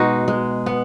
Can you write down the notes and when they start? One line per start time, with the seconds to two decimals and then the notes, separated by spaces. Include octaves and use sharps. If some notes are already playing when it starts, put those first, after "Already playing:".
Already playing: B2 G#3 D#4 F#4
0.28 G#3
0.66 B3